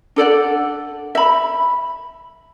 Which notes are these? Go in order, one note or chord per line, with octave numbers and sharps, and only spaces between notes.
D4 A4 D5 F#5
E5 B5